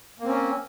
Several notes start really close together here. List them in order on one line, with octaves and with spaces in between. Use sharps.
A#3 C4 C#4